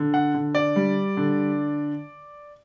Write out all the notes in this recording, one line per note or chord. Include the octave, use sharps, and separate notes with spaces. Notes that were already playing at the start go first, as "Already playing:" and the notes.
Already playing: D3
F#5
D3
D5
G3
D3